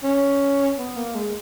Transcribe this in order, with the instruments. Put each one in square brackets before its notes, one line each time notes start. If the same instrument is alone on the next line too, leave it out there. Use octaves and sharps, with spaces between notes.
[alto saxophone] C#4
B3
A#3
G#3